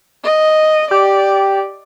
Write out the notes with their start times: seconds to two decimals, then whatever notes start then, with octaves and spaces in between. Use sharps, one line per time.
0.24 D#5
0.91 G4 D5